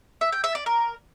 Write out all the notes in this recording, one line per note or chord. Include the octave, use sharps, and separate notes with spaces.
E5
G5
E5
D5
A#4